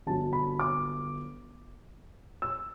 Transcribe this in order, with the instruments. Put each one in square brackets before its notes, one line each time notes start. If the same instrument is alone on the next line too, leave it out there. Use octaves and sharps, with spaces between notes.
[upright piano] G1 G2 F#3 A5
B5
D6
E6